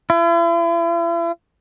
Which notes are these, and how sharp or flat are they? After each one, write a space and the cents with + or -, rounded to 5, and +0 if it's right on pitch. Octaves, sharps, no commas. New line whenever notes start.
E4 +45